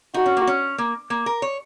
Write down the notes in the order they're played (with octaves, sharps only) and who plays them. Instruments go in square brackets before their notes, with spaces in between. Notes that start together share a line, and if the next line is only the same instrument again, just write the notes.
[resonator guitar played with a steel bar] D#4 [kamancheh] F#4
[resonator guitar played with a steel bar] C#4
A#3
C#4
A#3
A#3
A#4
C#5